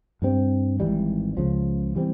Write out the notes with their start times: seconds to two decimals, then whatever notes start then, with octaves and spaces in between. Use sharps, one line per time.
0.22 G2 G3 C4
0.80 G#1 G#2 E3 G3
1.37 C#2 C#3 F3
1.96 E3 G3 C4